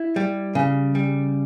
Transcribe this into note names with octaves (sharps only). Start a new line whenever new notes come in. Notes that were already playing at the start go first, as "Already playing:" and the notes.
Already playing: E4
G3
C#3
G3